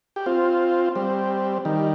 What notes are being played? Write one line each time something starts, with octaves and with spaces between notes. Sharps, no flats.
G4
C4 F4
G3 C4
D#3 G3